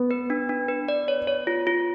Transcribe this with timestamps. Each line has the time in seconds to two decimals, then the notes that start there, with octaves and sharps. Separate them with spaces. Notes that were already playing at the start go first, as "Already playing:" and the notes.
Already playing: B3
0.11 B4
0.30 D4
0.49 D4
0.68 B4
0.88 D5
1.08 C#5
1.27 C#5
1.47 F4
1.67 F4